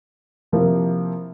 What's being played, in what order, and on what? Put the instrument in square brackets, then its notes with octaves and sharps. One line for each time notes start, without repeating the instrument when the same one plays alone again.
[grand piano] C3 F3 A#3 E4 A#4